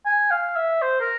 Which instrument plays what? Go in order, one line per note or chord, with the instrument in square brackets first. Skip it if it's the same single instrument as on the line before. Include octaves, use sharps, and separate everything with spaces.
[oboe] G#5
F5
E5
C5
A#4